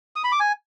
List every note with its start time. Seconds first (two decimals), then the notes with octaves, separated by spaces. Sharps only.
0.16 D#6
0.24 B5
0.32 D6
0.40 G#5